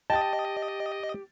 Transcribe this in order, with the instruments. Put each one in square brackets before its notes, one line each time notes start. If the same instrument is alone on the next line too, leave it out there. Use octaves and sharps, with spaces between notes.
[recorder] G4 [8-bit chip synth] D#5 [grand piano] G5 A6 [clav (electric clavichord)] A5